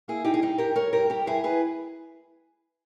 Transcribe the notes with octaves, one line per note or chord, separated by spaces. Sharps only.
A#3 E4 G#4
G3 D#4 G4
G#4
G2 D#4 G4
G2 G4 A#4
G2 A#4 C#5
G2 G4 A#4
G2 G4 A#4
G2 E4 G#4
G#4 B4